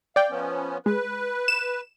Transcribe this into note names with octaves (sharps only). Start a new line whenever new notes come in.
D5 F5 G5
F3 B3 C#4
G#3 B4
E7